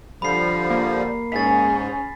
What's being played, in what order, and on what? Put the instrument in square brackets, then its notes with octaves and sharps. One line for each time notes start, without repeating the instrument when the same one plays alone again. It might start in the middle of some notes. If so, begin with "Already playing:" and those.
[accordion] D3 F3 G3 [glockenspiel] B5 C7
[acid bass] A#3
[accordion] G#2 [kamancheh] C#4 G#4 [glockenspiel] A6 B6